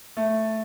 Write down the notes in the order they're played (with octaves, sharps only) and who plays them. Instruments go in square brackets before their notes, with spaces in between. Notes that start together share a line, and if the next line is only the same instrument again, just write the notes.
[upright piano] A3